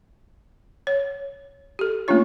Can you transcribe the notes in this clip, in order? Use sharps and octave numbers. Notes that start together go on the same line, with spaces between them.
C#5
G4 A4
A3 A#3 C#4 D4 F4 C#5